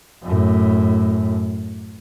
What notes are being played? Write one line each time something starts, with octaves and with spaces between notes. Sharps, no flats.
F#2 A2